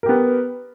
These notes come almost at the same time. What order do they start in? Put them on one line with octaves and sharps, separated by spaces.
A#4 G4 B3